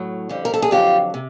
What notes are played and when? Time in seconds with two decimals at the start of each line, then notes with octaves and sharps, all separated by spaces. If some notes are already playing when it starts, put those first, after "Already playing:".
Already playing: A2 F#3
0.29 F2 D3 G3
0.45 A#4
0.54 A4
0.62 G#4
0.71 F2 D3 F#3 F4 G4
1.14 C3